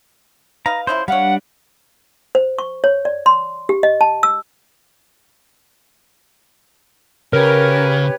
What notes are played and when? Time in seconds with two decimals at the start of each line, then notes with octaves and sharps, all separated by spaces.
0.66 D#4 B4 F5 A#5
0.87 C#3 F3 E4 C5
1.08 G3 D4 C#5 F5 F#5
2.35 C5
2.59 C#6
2.84 C#5
3.05 D5
3.26 C6
3.69 G4
3.83 D#5
4.01 A5
4.23 E6
7.33 C#3 G4 A#4 B4 C#5